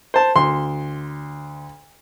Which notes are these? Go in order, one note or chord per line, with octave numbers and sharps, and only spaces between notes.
C5 A5
D2 C6